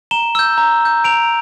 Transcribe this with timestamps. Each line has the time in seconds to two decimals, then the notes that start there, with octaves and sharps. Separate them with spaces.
0.11 A#5 E7 G7
0.35 E6 G6
0.58 A#5
0.81 E6 G6
1.04 A#5 D7 F7